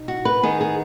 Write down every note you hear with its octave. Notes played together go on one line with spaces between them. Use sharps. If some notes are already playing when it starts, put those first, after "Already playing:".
Already playing: B2 D#4
F#4
B4
D#3 B3 D#4 G#4
G#4